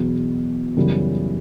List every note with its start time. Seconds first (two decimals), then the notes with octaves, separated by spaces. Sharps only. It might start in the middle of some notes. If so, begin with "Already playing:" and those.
Already playing: E2 B2 F#3 B3
0.77 F#2 C#3 E3 G3 B3